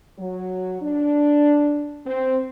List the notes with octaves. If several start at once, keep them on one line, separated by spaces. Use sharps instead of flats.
F#3
D4
C4